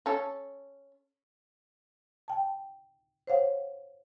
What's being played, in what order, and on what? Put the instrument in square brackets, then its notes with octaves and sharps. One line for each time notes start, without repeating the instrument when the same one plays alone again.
[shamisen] C#4 A4
[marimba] G5 A5
C5 C#5 F5 F#5